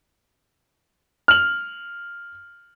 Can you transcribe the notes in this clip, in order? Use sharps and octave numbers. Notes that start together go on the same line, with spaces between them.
F6 F#7